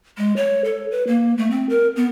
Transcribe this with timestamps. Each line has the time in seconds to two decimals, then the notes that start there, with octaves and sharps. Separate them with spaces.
0.18 G#3
0.36 C#5
0.65 A4
0.91 B4
1.07 A#3
1.38 A3
1.51 C4
1.70 A#4
1.96 B3